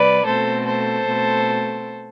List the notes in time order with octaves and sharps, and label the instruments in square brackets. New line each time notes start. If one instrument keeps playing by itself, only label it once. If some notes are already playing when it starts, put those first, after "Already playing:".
Already playing: [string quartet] C3 G3 B4 D5
B2 A3 C4 A4 C5
A4 C5
B2 A3 C4